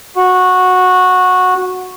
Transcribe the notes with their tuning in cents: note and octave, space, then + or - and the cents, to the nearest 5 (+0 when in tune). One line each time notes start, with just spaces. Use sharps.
F#4 -15